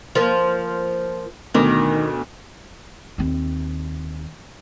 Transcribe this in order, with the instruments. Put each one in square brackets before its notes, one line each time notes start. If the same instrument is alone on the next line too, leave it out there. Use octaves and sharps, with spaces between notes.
[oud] F3 A#3
[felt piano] D2 B2 D6 [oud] D#3
[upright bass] D#2 C4